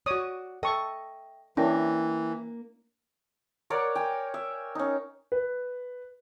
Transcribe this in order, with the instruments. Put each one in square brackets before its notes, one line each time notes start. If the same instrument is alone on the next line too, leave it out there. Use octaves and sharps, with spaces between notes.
[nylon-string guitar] F#4 D5 [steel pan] C#5 D#6
[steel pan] A4 C#6 [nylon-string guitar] D#5 [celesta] E5 G5
[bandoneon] E3 [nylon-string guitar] A#3 [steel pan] C#4 D4 E4 [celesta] A#4 G5 A#6
[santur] A#4 C#5 D5 F#5
G5 G#5
E5
C#4 D#4
[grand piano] B4